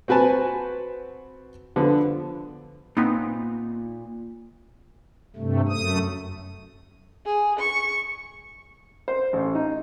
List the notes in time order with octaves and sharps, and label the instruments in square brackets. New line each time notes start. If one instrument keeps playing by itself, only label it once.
[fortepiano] C4 F#4 B4 G#5 A5
D3 F3 B3
[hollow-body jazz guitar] A#2 [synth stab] B3 C4 D#4
[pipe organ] G2 C3 A3
F#2 A3 D#6
[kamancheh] G#4
C#6
[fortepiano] C5
A1
D#4